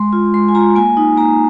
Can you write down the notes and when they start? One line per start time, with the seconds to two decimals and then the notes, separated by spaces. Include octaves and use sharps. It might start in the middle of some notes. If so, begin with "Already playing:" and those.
Already playing: G#3 C6
0.13 F4
0.34 G#3 C6
0.48 G#5
0.55 F4 A#5
0.75 A#3 G#5
0.97 D#4
1.17 A#3 A#5